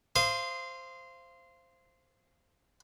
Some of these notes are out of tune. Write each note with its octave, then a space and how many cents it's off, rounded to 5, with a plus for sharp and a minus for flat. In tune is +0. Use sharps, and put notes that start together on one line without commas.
C5 +0 F5 -25 D#6 -10